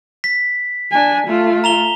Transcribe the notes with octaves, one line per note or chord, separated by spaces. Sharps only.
B6
D4 G#5
A3 F4
A#5 F7 G7